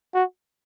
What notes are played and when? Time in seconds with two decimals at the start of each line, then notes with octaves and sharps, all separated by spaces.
0.14 F#4